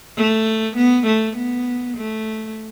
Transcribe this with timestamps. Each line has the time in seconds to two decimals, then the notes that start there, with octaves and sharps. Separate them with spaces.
0.17 A3
0.77 B3
1.07 A3
1.37 B3
1.97 A3